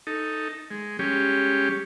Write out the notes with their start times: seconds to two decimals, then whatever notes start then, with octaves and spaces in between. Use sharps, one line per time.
0.07 D#4 A4
0.71 G#3
0.99 G3 G#3 C#4 G4